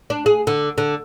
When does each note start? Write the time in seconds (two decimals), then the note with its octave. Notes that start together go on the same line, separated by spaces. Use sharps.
0.10 D4
0.26 G#4
0.47 D3
0.78 D3